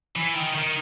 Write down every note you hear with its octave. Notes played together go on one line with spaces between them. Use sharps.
E3
D#3
D#3